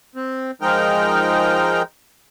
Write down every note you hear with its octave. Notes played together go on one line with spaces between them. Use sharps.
C4
F3 G#3 D#4 A#4 G5 F6